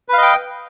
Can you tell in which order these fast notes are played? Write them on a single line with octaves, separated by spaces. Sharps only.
B4 F5 D#5 G5